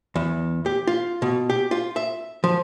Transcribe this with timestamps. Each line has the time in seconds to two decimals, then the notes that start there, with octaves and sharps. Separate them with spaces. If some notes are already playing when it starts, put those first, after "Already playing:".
0.16 E2
0.66 G4
0.87 F4
1.22 B2
1.50 G4
1.71 F4
1.96 E5
2.44 F3